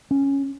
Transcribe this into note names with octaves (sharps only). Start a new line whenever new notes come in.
C#4